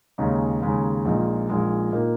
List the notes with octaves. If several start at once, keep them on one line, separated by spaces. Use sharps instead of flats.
D#2 C#3 G#3 D#4
D#2 C#3 G#3 D#4
A#1 A#2 G#3 D#4
A#1 A#2 G#3 D#4
A#2 A#3 D#4